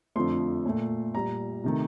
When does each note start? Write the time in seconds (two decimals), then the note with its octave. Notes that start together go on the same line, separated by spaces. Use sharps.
0.16 F2 D3 F3 A3 C6
0.65 A#2 A3
1.15 A#2 G3 A#5
1.64 C3 D#3 A3